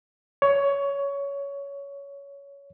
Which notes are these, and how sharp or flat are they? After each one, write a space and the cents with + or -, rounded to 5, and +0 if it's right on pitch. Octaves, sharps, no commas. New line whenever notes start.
C#5 +15